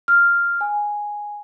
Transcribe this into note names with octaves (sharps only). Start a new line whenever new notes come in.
F6
G#5